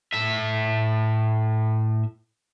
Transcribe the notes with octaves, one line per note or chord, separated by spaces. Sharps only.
A2 E5